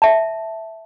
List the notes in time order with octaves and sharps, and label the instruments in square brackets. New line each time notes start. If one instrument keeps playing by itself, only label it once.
[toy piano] E5 A5